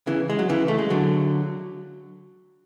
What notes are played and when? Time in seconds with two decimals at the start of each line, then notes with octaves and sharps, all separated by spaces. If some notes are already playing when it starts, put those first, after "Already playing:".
0.07 C#3 E3
0.30 G#3
0.39 F#3
0.49 C#3 E3
0.68 A3
0.79 G#3
0.90 D3 F#3